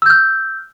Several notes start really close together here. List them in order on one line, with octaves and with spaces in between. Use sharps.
E6 G6 F6